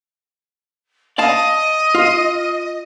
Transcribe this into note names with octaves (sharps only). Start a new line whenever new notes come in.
D5 D#5 F5 A5
F4